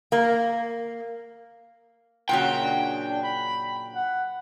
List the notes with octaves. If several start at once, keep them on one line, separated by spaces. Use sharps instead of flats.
A#3
A#2 C#3 F#3 G5
D4
B5
F#5